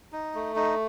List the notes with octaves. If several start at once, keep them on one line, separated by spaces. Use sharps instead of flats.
D#4
A3
D#4